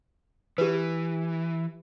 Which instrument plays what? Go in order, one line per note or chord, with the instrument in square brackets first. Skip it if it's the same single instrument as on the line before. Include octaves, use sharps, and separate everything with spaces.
[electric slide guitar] E3 [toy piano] G4 B4